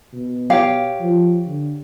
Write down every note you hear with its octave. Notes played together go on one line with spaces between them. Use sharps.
B2
G4 C#5 F5
F3
D3